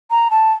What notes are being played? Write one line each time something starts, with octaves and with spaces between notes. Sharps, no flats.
A#5
A5